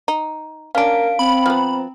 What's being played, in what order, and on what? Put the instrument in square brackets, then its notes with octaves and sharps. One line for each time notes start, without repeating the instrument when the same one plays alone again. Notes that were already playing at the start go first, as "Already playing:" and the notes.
[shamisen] D#4
[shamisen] C#4 D4 [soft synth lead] A#4 [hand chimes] F5 D7
[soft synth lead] C4 [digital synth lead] B5
[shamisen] F3 B3 [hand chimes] A#5